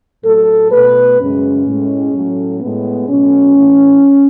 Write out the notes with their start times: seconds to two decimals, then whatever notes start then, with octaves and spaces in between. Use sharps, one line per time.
0.24 A2 F#3 A3 A4
0.71 B2 A3 B4
1.19 F#2 C#3 G#3 C#4
1.67 A2 G#3
2.14 A2 F#3 A3
2.61 A2 G#3 B3
3.09 B2 F#3 A3 C#4
3.56 A2 E3 A3